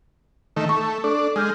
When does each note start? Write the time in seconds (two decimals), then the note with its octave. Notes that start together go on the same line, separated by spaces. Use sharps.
0.57 D#3 A3
0.69 A3 C#6
1.04 D4 A4
1.36 G#3 D#6 F6 G6